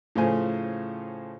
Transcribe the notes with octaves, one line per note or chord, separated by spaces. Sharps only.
A2 C#3 F3 C5 G#5